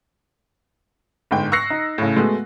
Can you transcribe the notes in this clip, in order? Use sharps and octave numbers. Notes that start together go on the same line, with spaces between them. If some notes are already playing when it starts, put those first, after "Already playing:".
G1 G#2 G5
C#6 E6 F#6 A#6 C7 C#7
D#4
A2 C#3
G#3 A3 B3 F#4